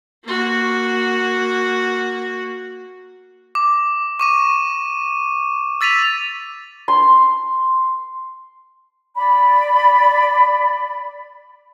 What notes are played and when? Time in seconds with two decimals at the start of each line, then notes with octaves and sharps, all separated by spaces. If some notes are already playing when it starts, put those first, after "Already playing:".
0.24 A#3 F#4
3.55 D6
4.20 C#6 D6 D#7
5.81 E6 A6 B6 D#7 F7
6.88 C6
9.16 D5 B5